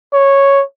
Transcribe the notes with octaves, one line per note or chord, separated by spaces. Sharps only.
C#5